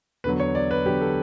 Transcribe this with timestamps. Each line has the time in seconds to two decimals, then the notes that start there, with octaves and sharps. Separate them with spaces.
0.24 E2 D3 F#3 B4
0.40 C#5
0.55 D5
0.71 B4
0.85 E2 D3 F#3 G4
1.01 A4